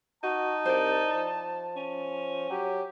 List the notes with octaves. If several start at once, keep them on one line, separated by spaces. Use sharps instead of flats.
D#4 F#4 A5
C2 C5 D5
F3
C#4
F#3 G4